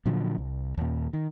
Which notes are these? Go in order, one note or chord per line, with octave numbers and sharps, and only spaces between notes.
A#2 D3 F3 F#3
C2
D#2 A#2
D#3